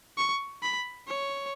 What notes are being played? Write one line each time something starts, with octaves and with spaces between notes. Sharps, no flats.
C#6
B5
C#5